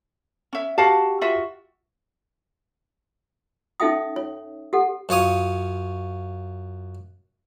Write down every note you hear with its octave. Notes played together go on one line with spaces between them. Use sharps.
C#4 E5
F#4 G4 F5 A5
F4 F#4 E5
C#4 D#4 A4 E5 G5 D#6
C#5
G4 A4 F#5
F#2 F4 C#5 D#6